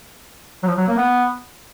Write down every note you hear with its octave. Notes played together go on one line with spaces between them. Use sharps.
F#3
F3
F#3
A#3
B3